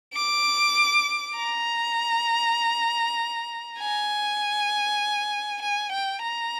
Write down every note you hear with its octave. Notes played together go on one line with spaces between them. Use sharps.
D6
A#5
G#5
G#5
G5
A#5